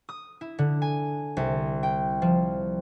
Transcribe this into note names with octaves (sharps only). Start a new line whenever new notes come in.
D#6
E4
D3
G#5
C2
G5
F3